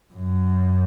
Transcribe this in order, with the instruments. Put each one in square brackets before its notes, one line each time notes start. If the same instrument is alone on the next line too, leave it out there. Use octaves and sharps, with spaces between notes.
[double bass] F#2